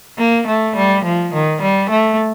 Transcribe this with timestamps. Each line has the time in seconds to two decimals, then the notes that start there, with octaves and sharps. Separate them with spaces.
0.18 A#3
0.47 A3
0.76 G3
1.04 F3
1.33 D#3
1.62 G3
1.90 A3